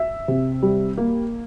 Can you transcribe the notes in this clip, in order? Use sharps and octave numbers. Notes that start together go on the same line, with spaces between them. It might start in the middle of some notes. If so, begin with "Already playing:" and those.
Already playing: E5
C3
G3
A#3